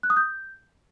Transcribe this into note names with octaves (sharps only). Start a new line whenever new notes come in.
F#6
D#6
G6